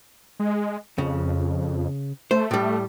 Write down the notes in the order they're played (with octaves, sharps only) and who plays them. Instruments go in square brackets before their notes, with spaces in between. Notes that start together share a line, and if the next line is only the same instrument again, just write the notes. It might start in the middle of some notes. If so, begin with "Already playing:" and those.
[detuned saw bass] G#3
[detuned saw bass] F2 [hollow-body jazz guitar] C#3
[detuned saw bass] A3 [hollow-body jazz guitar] C5
[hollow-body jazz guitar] A2 G3